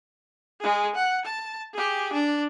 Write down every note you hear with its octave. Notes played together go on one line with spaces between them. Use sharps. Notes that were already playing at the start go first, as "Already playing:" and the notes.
G#3 G#4
F#5
A5
G4 G#4
D4